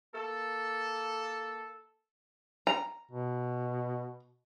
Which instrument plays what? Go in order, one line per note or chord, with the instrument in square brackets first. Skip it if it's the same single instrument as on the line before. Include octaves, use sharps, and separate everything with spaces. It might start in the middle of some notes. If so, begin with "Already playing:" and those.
[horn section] A#3 A4
[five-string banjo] A#5
[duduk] B2